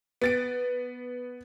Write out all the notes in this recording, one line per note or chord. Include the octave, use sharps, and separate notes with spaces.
B3 A6 D7